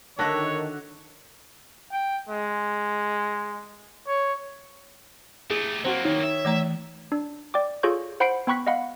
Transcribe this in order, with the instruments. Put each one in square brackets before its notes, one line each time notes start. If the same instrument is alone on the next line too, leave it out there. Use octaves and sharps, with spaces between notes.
[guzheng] D3 F#4 E5 [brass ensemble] D#3 [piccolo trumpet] C#5 [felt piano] A5 F#6 A#6
[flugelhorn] G5
G#3
C#5
[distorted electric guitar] A3 G4 [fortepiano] G#4
[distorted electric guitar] F#3 A#3 [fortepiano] C4 F#4
[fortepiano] D#3 [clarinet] C#5
[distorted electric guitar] E5
[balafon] E3 A3 A#5
[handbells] D4
D5 G5 D6
F4 G#4 A4 C#5 C#6 G6
C5 F#5 B5 G6 C7 D7
B3 G5 B5 C#6 F#6 B6
D#5 F5 F#5 B5